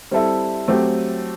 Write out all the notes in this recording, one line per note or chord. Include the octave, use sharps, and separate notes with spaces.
G3 C4 E4 A4 E5
F#3 A3 C4 G4